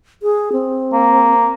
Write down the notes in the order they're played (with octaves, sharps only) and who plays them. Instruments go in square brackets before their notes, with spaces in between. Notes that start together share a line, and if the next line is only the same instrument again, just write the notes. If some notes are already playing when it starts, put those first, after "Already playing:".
[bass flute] G#4
C4
[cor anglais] A#3